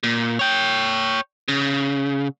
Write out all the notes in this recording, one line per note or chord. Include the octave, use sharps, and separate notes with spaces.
A#2
C#5 G5
C#3